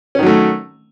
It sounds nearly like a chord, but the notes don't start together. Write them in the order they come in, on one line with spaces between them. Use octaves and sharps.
C#4 D#3 F#3 A3